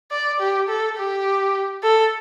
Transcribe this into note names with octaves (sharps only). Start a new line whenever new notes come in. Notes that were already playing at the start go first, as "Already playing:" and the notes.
D5
G4
A4
G4
A4